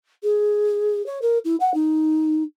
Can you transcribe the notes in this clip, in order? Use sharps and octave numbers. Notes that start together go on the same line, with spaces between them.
G#4
C#5
A#4
E4
F#5
D#4